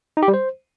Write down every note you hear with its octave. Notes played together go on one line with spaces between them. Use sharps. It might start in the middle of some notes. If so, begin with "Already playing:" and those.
D#4
G4
G3
C5